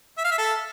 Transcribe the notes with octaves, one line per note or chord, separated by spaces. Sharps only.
E5
F5
E5
A4